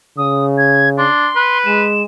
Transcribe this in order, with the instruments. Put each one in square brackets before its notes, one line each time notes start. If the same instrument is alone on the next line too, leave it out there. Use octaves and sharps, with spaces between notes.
[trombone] C#3 [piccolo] D#6
[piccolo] G#6
[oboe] D4 [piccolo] C6
[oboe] B4
[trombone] G#3 [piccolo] E7